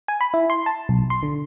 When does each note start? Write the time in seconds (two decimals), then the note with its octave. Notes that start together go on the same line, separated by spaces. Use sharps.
0.08 G#5
0.21 B5
0.34 E4
0.50 C6
0.66 A5
0.89 B1
1.10 C6
1.23 D3